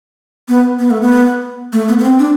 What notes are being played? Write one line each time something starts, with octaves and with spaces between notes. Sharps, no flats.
B3
B3
A3
B3
A3
B3
B3
C4
D4